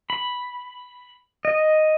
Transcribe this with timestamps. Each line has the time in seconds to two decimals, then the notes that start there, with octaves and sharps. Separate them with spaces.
0.10 B5
1.45 D#5